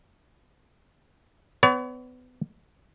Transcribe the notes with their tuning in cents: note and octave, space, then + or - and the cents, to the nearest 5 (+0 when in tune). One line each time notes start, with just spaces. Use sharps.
B3 +30 C#5 +40